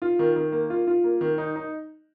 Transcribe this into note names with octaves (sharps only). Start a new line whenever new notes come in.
F4
D#3
D#3
A#3
F4
F4
A#3
D#3
D#4
D#4